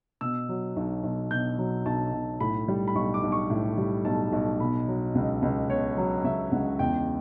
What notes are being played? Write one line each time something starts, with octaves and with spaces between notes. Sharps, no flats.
B2 E6
F#3
B1
B1
B2 G6
F#3
B1 A5
B1
A2 B5
G3
B5
B1 C#6
D6
B1
C#6
A2
G3
B1 A5
B1
B2 B5
F#3
C#2
C#2
B2 C#5
F#3
C#2 E5
C#2 F#5
E2 G5